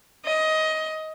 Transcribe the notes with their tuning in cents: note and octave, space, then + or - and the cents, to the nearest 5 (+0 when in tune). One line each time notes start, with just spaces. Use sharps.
D#5 +15